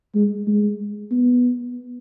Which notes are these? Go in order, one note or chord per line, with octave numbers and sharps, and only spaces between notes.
G#3
G#3
B3